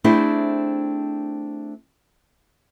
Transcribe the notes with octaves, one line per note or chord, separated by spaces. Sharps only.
A3 C4 D4 E4 G#4 C5